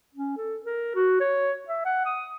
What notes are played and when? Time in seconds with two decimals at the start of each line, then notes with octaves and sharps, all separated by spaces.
0.15 C#4
0.37 A4
0.65 A#4
0.95 F#4
1.20 C#5
1.68 E5
1.85 F#5
2.06 D#6